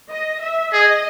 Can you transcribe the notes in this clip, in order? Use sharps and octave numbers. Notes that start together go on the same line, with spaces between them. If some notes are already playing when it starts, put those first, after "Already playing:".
D#5
E5
G#4 D#5